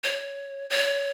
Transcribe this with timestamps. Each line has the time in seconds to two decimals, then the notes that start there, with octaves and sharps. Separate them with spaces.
0.04 C#5
0.70 C#5